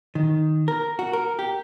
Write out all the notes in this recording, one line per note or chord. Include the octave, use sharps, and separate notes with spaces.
D#3
A#4
F#4
A#4
G4